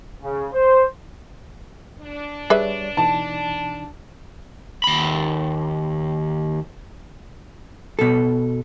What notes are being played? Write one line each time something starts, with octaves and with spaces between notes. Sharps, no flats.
C#3
C5
D4
G3 G#4 B4 C#5 D5 E5
B2 E3 D#4 A5
D#2 B5
B2 A4